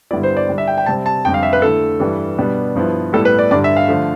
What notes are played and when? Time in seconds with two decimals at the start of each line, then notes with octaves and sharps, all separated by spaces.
0.11 G2 D3 G3 B3 E4 D5
0.23 C5
0.37 D5
0.49 D3 G3 D4
0.58 E5
0.68 G5
0.78 G5
0.86 C3 G3 C4 A5
1.06 A5
1.25 F2 D3 G3 G5
1.34 F5
1.43 E5
1.53 B4
1.62 D3 A3 E4 A4
1.99 G2 E3 G3
2.38 B2 G3 B3 D4
2.76 G2 F3 B3 E4
3.13 A2 G3 B3 E4 A4
3.25 B4
3.39 D5
3.51 G2 D3 G3 D4 D5
3.64 E5
3.76 F5
3.88 D3 F3 A3